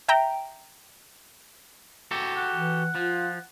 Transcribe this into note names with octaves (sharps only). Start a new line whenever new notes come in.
E5 G5 A#5
F#4 G4 A4
F#5
E3
F3 F4